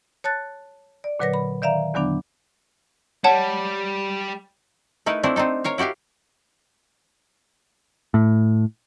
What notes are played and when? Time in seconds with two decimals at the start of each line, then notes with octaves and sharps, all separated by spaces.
0.24 C#5 A5 F#6 A6
1.04 D5
1.19 A#2 D3 F#3 B4 C#5 A#6
1.34 B5
1.62 D#3 D5 E5 F5 A#5
1.94 E2 D3 F#3 B3 D4
3.24 G3 C#5 F#5 A5
5.06 A3 D#4 E4 A#4 B4
5.23 A3 C4 D4 E4
5.36 C4 D4 D#4 A4
5.64 A#4 C#5 F5
5.78 E4 F#4 G4 E5 F5
8.14 A2